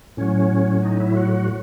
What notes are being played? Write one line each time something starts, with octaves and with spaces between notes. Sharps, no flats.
A2 F#3 C#4
D#4
E4
F#4
F#4